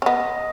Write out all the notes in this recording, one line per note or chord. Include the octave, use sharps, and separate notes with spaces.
C#4
B3 D#5